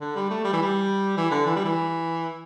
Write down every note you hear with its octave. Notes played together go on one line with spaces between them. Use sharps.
D3
G3
A3
G3
E3
G3
E3
D3
E3
G3
E3